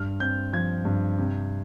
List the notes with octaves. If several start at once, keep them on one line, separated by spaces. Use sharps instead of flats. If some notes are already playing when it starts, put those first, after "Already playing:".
Already playing: G2 F6
C4 G6
F3 G#6
G2
C3